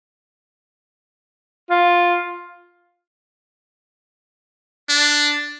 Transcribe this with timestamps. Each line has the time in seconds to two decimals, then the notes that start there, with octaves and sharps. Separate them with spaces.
1.70 F4
4.89 D4